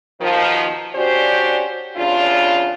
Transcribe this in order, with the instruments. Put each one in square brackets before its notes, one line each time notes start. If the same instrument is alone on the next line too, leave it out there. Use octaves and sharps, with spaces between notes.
[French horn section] D#2 B2 D#3 F3
C#4 D4 F#4 G4 C5 D5
E2 G2 C#3 D4 F4